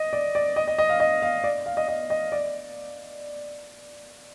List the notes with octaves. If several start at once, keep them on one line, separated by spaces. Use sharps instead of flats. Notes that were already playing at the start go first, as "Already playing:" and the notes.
Already playing: D#5
D5
D5
D#5
D#5
D#5
F5
D#5
F5
D5
F5
D#5
D#5
D#5
D5